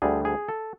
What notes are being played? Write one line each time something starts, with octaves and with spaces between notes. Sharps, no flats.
D2 D3 G3 G#4
G#4
A4